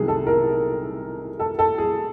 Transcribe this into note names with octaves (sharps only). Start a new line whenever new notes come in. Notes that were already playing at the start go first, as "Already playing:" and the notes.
Already playing: C2 C3 D#3 F#3 G#4
A4
A#4
A4
A4
G#4